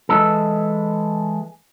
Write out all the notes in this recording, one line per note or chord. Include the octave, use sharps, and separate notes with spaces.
E3 G#3 A4